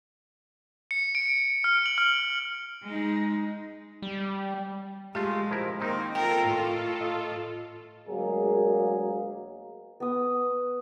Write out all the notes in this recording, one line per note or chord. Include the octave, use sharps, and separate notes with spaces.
C#7
D7
F6
F#7
F6
G#3 D#4
G3
G#3 A3 F4 G4
F3 E4 A#4
D#3 A#3 C4 D#4
F4 A4 A#4 G5
A2
D#5
D2 F#3 G#3 A#3 G#4 A#4
B3 D#6